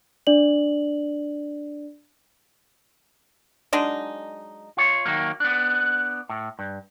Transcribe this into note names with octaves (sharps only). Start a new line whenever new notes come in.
D4 D5 F#7
F#3 G#3 D4 D#4
F4 C#5
D#3 F#3 A#3
B3 D4
A2
G2